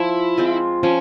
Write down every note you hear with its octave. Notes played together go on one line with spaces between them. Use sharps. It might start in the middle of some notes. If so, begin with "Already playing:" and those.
Already playing: F3 E4
G#3 C4 F4
F3 C#4